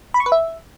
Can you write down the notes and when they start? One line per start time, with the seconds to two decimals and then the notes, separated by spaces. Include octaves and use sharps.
0.14 B5
0.20 C#6
0.26 B4
0.32 E5